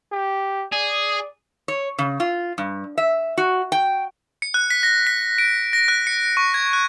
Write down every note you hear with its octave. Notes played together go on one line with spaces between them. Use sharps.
G4
G#4 D5
C#5
C#3
F4
G2
E5
F#4
G5
C#7
F#6
B6
A#6
B6
D7
A#6
F#6
C#7
C#6
G#6
F#6